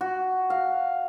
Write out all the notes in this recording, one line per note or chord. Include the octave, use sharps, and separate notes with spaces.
F#4
F5